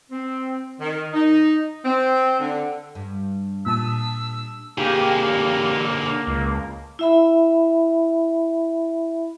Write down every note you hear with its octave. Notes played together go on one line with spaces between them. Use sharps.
C4
D#3
D#4
C4
D3
G2
A#2 A5 D#6 E6
D3 A#3 G4 G#4
C#2
E4 E5 B5